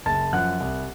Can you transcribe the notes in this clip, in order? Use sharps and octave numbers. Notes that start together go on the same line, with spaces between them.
F#1 A5 A6
F#2 F3 F#5 F#6
C2